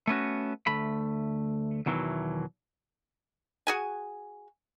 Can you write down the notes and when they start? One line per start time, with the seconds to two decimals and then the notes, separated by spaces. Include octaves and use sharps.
0.07 A3 B3 C#4 F#4
0.67 D2 A3 B5
1.86 E2 B2 D#3 E3 F#3
3.67 F#4 G#4 G#5